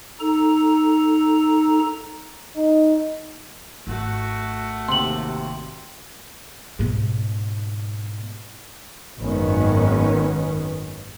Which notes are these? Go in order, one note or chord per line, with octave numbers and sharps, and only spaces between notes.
D#4 A4 A#5
D#4
G#1 A3 F#4
D#2 C3 C6 F#7
G#2 B2
G#1 F#2 D#3 B3 C#4